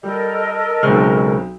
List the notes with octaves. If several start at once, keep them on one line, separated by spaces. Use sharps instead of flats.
G3 A4 A#4 D#5
B1 C#3 G#3 C4 F6